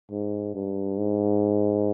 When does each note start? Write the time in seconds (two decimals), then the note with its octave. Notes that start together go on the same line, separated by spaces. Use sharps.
0.11 G#2
0.55 G2
0.98 G#2